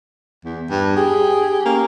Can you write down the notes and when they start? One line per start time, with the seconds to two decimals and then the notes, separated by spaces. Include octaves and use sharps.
0.45 E2
0.70 G2
0.96 G4 G#4
1.65 A#3 C#4